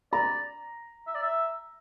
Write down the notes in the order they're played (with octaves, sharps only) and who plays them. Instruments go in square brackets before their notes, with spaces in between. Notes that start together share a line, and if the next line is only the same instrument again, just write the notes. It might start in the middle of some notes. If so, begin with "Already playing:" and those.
[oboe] D5 [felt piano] A#5
[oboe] E5
D5
E5